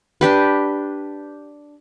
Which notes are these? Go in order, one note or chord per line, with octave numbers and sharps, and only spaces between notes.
D4 G4 B4